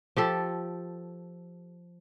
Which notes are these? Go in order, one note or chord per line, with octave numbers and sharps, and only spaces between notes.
F3 G4 A4